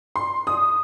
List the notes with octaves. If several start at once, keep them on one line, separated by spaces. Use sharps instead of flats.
C6
D#6